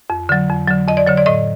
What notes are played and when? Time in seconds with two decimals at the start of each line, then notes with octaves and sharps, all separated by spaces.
0.10 F2
0.29 D3 F#3
0.49 F2
0.68 D3 F#3
0.87 F2 D#5
0.97 D5
1.07 D3 F#3 C#5
1.17 D5
1.26 A2 D#5